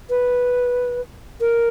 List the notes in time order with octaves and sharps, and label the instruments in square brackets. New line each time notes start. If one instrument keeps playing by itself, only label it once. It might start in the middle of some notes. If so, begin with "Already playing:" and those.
[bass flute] B4
A#4